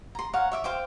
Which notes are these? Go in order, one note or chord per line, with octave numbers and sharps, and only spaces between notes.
A#5 C6
C#5 F5 F#5 A#5
C#5 E5 D6
C5 F5 G5 D6